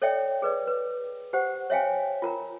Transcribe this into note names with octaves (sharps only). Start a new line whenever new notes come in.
A4 C#5 D5 E5 G5
G#4 B4 D5
B4
G4 C5 F#5
C#5 E5 F5 G5 G#5
F4 A#4 A#5